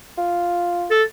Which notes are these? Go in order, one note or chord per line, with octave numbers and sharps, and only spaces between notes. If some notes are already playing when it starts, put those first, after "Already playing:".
F4
A4